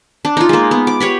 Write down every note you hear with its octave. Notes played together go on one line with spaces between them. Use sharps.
D4
D#4 F4
G#3 A#3
B3
D6
G4 B4 C#5